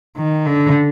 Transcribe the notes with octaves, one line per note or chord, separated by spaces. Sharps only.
D#3
D3